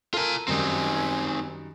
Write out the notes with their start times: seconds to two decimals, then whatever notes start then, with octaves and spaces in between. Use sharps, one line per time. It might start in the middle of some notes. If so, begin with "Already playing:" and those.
0.14 F4 A4 A#4 G#5
0.48 F#2 D#3 G3 C4 D#4 G#5